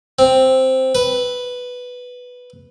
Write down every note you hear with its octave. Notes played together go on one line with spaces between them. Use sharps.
C4
B4